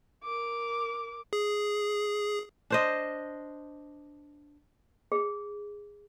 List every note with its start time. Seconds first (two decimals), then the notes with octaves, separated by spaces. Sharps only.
0.24 A#4 D6
1.33 G#4
2.70 D4 C5 D#5
5.12 G#4